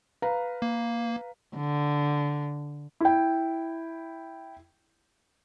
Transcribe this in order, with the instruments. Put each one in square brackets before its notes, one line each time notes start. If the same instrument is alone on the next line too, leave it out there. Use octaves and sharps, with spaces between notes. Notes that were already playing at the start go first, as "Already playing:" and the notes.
[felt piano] B4 F5 A#5
[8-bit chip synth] A#3
[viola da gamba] D3
[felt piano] E4 G5